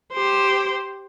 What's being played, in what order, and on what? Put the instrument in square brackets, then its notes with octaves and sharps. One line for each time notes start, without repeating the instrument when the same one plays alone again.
[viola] G4 C5